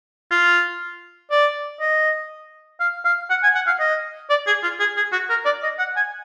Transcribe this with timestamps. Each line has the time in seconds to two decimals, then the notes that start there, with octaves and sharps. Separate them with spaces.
0.31 F4
1.31 D5
1.80 D#5
2.80 F5
3.04 F5
3.30 F#5
3.43 G#5
3.55 F#5
3.67 F5
3.79 D#5
4.30 D5
4.47 G#4
4.63 F4
4.79 G#4
4.96 G#4
5.12 F#4
5.29 A#4
5.45 D5
5.63 D#5
5.78 F#5
5.96 G#5